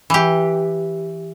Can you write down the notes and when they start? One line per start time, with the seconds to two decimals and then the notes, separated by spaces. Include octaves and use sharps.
0.10 E3 G4